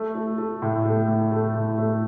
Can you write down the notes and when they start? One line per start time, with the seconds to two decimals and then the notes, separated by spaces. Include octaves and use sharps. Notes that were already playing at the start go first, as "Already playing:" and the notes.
Already playing: A3
0.15 A3
0.38 A3
0.62 A2
0.85 A3
1.08 A2
1.32 A3
1.55 A2
1.78 A3